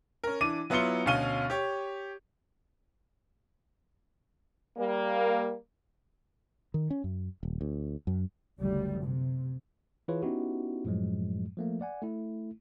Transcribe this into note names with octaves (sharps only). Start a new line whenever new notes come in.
C#4 A#4
E3 D4 D6 D#7
F#3 B3 E4 F4 C#7 G7
D2 B2 C#4 F5 D#7 G7
G4 C#5
G3 A#3
D#3
C#4
F#2
D#1
D2
F#2
F#1 D2 G3
C3
E3 E4 F4 G#4 B4 C#5
B3 C#4 D#4 E4 F#4 G4
F#2 A2 F3 F#3 G#3
F3 A3 A#3
D5 F#5 G#5
A3 E4